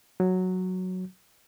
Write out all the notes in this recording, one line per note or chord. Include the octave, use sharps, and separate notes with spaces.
F#3